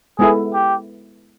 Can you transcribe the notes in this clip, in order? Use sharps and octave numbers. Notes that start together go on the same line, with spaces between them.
G#3 B3 E4 G#4 A4
G4